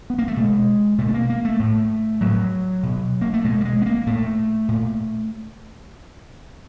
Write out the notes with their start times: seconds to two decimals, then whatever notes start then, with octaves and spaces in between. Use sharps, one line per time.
0.10 B3
0.19 A#3
0.28 A3
0.37 B2 G#3
0.98 B2 A3
1.09 B3
1.14 A#3
1.29 A#3
1.45 A3
1.59 A2
2.21 A2 F#3
2.83 B2
3.21 A#3
3.34 A3
3.44 B2 G#3
3.61 G3
3.65 G#3
3.82 B3
3.86 A#3
4.07 A#2 A3
4.68 A#2